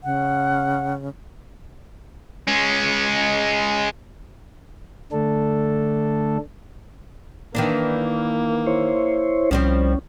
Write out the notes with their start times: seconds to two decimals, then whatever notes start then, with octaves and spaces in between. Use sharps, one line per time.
0.04 C#3 F#5
2.47 G#3 C#4
5.12 D3 A3 D4 A4
7.55 D#3 E3 A#3 D4
8.67 E4 C5 C#5
9.51 C2 F3 G3 C4 C#4